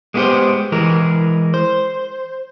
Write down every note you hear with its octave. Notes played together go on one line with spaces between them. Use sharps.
G#3 A#3 B3 E4 G4 C5
E3 G#3 A#4
C5